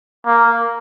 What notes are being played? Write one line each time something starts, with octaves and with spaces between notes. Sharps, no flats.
A#3